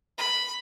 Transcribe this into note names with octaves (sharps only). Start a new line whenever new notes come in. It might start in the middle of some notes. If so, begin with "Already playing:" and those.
B5